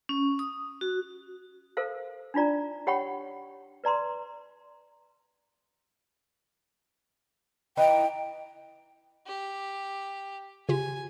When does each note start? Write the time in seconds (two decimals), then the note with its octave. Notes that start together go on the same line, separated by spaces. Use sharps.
0.09 C#4
0.39 D#6
0.81 F#4
1.77 A4 A#4 C5 F5
2.34 D4 D#4 F4 D5 A#5
2.87 G4 C#5 F#5 G5 B5 C#6
3.84 B4 D5 A#5 C6
7.77 E3 D#4 E4 G5
9.27 G4
10.69 C#3 F4 G4 G#5